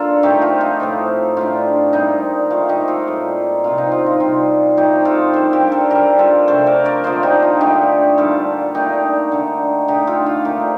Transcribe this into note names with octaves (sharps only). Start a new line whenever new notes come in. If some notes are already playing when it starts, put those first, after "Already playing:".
Already playing: A#3 D4 F4 A4
F3 A3 C4 D#4 G4
F4
D#4
A2 F3 C4 D#4
A2 A3 D4 F4
A#2 G3 C4 D#4
F3 A3 D#4 F4
D#4 G4
F4 A4
A2 G3 A#3
C3 F3 C4 F4
D#4
F4
D#4
C3 G3 C4 F4
F3 A3 C4 D#4 G4
F4 A4
D#3 G3 D4 A4 C5
G4 A#4
A4 C5
D#3 G3 D4 G4 A#4
F4 A4
C3 F3 A3 D4 A4 C5
A#4 D5
A#4 D5
D3 F3 A#3 D4 C5 D#5
D#4 G4
F4
D3 A3 D4 D#4 G4
A#2 G3 D4 F4 A4
A#2 A3 D4 D#4 G4
D3 A3 D#4
D3 A3 D4 D#4 G4
F4 A4
F4
A#2 A3 C4 D#4 G4